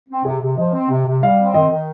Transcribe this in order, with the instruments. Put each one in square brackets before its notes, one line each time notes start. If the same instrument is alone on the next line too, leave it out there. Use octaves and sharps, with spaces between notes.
[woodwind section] C4
[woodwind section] C3 [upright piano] G#4
[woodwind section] C3
[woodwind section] F3 [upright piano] D#5
[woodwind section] C4
C3
C3
[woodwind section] G3 [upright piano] F5
[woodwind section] C4
[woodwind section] D#3 [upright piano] D#5
[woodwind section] D#3